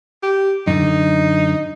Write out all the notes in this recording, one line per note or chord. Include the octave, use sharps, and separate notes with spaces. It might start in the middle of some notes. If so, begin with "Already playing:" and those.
G4
F#2 D3 D#4